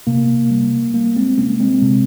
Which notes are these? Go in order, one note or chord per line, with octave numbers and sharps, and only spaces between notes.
C3 A#3
G3
G3 A#3
G#3 C4
C3 A#3 C#4
G#3 C4
C3